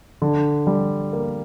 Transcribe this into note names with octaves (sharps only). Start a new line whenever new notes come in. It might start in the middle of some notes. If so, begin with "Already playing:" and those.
D3
G3
A#3